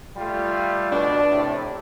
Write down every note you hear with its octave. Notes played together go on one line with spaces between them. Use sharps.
G3 A3 F4
B2 D4
A2 C3